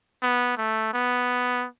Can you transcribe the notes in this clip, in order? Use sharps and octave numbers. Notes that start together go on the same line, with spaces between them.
B3
A3
B3